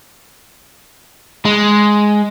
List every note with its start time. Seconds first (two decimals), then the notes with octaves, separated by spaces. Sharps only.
1.45 G#3